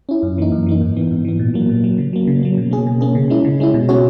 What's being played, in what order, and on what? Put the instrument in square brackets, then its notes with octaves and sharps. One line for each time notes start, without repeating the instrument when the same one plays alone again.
[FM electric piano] C#4 E4
F#2
E3 A#3 D#4
F#2
E3 A#3 D#4
G#2
E3 B3
G#2
E3 B3
A#2
F#3 A#3
A#2
F#3 A#3
C#3
F#3 A#3
C#3
F#3 A#3
B2
A#3 C#4 G#4
B2
A#3 C#4 G#4
C#3
G#3 C#4 E4
C#3
G#3 C#4 E4
B2
G#3 C#4 F#4 C#5